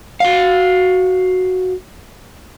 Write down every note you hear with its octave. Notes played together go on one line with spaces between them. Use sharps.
F#4 F5